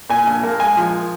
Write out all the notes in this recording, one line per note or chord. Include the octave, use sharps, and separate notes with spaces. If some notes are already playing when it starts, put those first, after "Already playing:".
A#2 G#5
A#1
A#3
G#3 G#5
F3